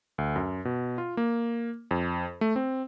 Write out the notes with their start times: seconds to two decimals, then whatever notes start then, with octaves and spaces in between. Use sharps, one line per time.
0.18 D2
0.36 F#2
0.65 B2
0.98 F4
1.17 A#3
1.91 F2
2.41 A3
2.56 C4